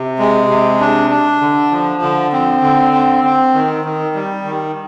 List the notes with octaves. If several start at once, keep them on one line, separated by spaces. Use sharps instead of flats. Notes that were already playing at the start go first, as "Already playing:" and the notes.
Already playing: C3
G#3
C3
D4
D4
D3
F3
D3
C4
D3
C4
C4
D#3
D#3
G3
D#3